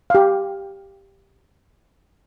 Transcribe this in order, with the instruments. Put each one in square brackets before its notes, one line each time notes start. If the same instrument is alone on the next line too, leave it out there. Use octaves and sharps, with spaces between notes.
[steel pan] G4 F5